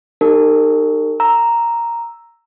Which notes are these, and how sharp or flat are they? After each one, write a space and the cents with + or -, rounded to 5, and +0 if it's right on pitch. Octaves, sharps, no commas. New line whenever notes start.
D#4 -25 G4 +25 A#4 -35
A#5 +0 E6 +0